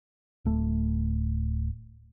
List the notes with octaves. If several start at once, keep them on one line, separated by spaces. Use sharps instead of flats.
D1 A3